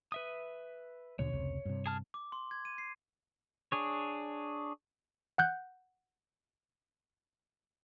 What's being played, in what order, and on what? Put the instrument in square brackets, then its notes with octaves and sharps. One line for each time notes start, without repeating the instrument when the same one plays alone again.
[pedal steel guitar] B4 E5 D#6
[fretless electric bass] D#2 B2 D3 [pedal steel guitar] C#5
[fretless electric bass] F1 C#2 C3
G2 C3
[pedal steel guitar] G#4 A5 F6
[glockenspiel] D6
C6
G#6
D#7
C7
[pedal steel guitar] D4 G#4 C#5
[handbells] F#5 F#6 G6